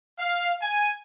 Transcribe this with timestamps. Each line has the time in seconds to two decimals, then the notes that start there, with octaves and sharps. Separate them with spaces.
0.18 F5
0.62 G#5